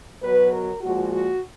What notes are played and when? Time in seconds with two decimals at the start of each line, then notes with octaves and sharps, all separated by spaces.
0.21 B2 F#3 B4
0.52 A#4
0.81 A#2 F3 G#3 F#4
1.12 F#4